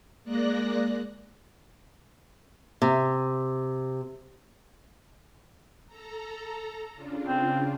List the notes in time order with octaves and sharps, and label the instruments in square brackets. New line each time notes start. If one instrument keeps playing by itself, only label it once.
[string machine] G#3 A#3 D5 F#6 A#6
[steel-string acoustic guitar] C3
[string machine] A4 A#5
C#3 D4 F4
[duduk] C4